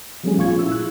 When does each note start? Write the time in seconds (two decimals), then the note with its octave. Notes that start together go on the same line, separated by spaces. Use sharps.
0.24 F3 G3 A3 B3 C#4 G#4
0.37 G#1 A#2 F4 C#6 G#6
0.59 E4 E6
0.72 F#6